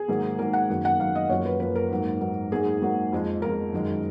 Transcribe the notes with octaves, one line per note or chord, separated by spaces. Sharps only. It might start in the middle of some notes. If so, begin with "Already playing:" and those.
Already playing: G#4
G#2 D#3 F#3 A#3
G#2 D#3 F#3 A#3 A#4
F#5
F#2 D#3 F#3 A#3
F#5
F#2 D#3 F#3 A#3 F5
D#5
F#2 F3 A#3 C#5
B4
F#2 F3 A#3 B4
A#4
G#2 F#3 A#3
G#2 F#3 A#3
G#2 F#3 A#3 G#4
G#2 F#3 A#3
F2 F3 G#3
F2 F3 G#3 A#4
F#2 D#3 G#3